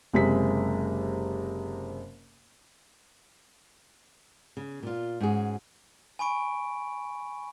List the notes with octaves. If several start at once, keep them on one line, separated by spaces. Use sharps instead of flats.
F#1 C3 G#3 C4 B6
C#3
A#2 F4
G#2 C#4 F#4 G#4
G#5 B5 C#6 D7